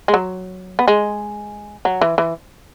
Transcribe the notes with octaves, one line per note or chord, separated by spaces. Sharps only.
G#3
F#3
B3
G#3
F#3
E3
E3